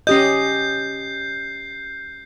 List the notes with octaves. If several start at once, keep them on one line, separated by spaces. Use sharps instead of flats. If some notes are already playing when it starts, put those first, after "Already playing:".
C#4 G4 D#5 G6 C7